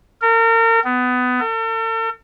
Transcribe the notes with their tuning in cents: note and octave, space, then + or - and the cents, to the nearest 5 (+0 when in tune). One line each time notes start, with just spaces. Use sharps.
A#4 -35
B3 +20
A4 +45